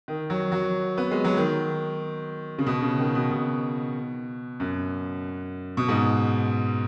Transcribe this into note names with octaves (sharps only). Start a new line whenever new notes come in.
D#3
F#3
F#3
B3
G#3
F#3
D#3
C#3
B2
C#3
D#3
B2
B2
F#2
B2
G#2